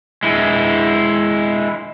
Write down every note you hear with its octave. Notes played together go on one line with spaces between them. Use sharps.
G#3 E4